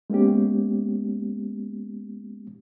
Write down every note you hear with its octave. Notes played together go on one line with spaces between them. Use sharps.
G#3 A#3 B3 C#4 G4